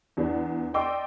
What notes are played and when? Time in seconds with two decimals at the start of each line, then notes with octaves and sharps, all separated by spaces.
0.17 E2 B3 D4
0.74 D5 D#5 G5 C6 D6 E6